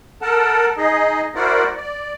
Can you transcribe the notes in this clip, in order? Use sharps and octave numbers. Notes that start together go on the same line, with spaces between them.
A4 A#4 F#5 A5
D#4 G#4 D#5
E4 F#4 A#4 C5 D5 F#5
D5